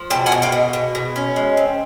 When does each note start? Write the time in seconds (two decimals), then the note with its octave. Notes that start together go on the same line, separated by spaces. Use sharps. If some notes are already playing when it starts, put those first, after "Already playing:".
Already playing: F3
0.10 B2 G5 A5
0.26 F#5 G#5
0.32 B2
0.42 F5 G5
0.52 B2
0.73 B2
0.95 B2
1.16 C#4
1.36 G#3
1.57 C4